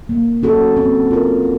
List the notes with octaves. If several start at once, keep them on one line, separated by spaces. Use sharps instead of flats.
A#3
C#4 F#4 A4
C4
F4 A#4